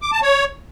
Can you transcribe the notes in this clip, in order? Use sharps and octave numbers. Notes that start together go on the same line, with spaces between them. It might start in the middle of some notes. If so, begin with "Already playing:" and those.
D6
A5
C#5